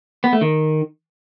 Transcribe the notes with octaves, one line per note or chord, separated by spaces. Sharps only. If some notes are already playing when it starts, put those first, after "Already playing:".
B3
A3
D#3